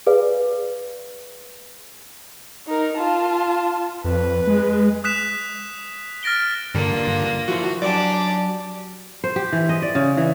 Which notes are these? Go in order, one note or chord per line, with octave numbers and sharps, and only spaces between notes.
G#4 B4 D5 F5
D#4 A#4
F4 A5
F2 B4
G#3
D#6 F#6 B6 E7
F6 A6 A#6 D7 G7
G2 D3 A#3 F4
F3 E4 F#4 C5
F#3 D4 G4 D5 G#5 D6
C5
G4
E3
D#5
D5
C#3
E3